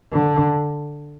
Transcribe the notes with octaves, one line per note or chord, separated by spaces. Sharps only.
D3